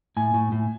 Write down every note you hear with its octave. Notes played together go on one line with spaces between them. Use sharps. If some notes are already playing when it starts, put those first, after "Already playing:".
A2 G#5
A2
A2